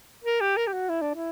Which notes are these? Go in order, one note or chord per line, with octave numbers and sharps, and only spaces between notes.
A#4
G4
A#4
G4
F#4
E4
D4
E4